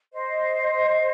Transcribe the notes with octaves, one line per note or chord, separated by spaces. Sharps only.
C5 D#5